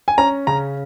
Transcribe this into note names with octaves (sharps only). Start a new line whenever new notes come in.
G#5
C#4 A#5
C#3 A#5